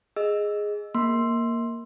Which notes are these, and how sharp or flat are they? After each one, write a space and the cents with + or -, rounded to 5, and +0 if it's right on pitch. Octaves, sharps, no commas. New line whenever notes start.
G#4 +0 D#5 +0 E6 +0
A#3 +0 C6 +5